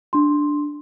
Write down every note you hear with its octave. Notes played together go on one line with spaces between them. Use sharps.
D4 C6